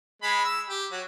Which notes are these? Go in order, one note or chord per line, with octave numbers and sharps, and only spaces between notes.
G#3 B5
E6
G4
F#3